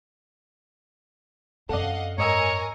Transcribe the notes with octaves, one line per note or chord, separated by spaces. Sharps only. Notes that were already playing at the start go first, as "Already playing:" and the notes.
F#2 C4 A4 D5 D#5 F5 F#5
G#2 A#4 C#5 D#5 G#5 A#5 E6